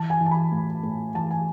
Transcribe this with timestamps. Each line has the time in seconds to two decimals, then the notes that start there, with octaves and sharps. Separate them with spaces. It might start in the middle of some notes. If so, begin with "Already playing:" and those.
Already playing: E3 A5
0.10 G#5
0.21 E3
0.26 A5
0.31 B5
0.52 A2
0.83 A2
1.15 E3 A5
1.31 G#5